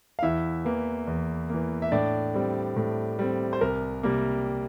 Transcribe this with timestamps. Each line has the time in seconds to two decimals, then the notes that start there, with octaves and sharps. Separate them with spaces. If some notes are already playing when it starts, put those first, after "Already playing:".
0.19 F5
0.22 E2 E4 E5
0.65 E3 A#3
1.07 E2
1.50 E3 A#3
1.82 E5
1.92 A2 D4 D5
2.34 G3 C4
2.76 A2
3.19 G3 C4
3.53 C5
3.61 C2 A#4
4.03 C3 G3 A#3